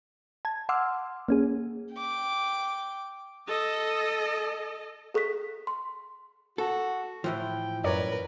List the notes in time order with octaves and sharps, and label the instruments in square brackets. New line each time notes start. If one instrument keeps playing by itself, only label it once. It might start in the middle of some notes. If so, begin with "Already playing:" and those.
[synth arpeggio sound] A5 G#6
F#5 C6 D6 E6 F6
A#3 C#4 G#4
[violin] G5 D6
[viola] A4 D#5
[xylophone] G#4 A4 C#6 F#6 B6
C6
[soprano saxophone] F#4 [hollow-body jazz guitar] A4
[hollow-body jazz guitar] A2 E3 F3 [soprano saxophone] G5
[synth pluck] F#2 C#5 D5 [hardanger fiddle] A#4 B4